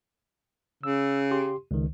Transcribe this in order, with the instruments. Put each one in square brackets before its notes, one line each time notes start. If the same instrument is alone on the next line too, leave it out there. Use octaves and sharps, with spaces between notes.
[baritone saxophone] C#3 [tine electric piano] E6
[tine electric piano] G4 C6
C#2 D#3